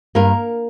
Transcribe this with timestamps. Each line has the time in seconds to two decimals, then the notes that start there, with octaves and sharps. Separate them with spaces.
0.15 G2 A#3 A#4